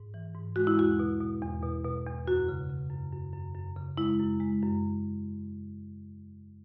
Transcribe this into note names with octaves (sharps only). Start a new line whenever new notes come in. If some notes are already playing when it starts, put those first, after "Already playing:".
Already playing: G#2
E3
G#2
G#3 F#4
E4
E2 F#4
B2
B2
E2
B2
B2
E2
F#2 F#4
C#3
C#3
F#2
F#2
F#2
F#2
C#3
G#3 E4
F#2
G#3
F#2